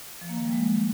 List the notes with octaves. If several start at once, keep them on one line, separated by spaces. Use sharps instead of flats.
F3
A#3
D#3
G3
G#3